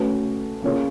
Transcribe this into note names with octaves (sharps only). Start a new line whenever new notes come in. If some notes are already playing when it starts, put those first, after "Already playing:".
Already playing: A3 C#4 F#4 B4
A#3 C#4 F4 G#4 C#5